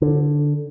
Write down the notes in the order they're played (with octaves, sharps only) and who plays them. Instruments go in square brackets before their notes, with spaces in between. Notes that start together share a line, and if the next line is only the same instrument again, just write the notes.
[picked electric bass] D3